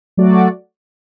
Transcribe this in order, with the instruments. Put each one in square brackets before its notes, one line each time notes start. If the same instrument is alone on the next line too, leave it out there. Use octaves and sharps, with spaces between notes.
[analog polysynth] F#3 A3 F#4 D5